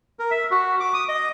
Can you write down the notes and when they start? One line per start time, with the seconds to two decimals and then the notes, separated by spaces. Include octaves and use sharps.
0.19 A#4
0.31 E5
0.51 F#4
0.80 D6
0.94 D#6
1.09 D#5